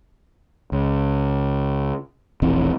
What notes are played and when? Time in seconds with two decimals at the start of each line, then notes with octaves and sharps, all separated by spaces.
0.72 C#2
2.42 E1 A#1 E3 C4